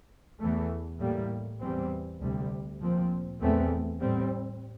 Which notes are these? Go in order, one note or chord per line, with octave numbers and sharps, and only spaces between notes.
E2 E3 A3
A2 G3 A#3
E2 E3 G3 C4
D2 C3 G3
A#2 F3 C4
E2 E3 A3 C4
A2 G3 C4